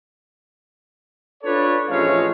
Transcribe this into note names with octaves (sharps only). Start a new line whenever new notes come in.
D4 F4 A4 B4 C#5 D5
A1 F3 G#3 A3 C#5 F5